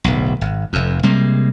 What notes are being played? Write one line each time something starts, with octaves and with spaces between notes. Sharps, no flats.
D1 B1
G#1
F1 F2
C3 G3 G#3 A#3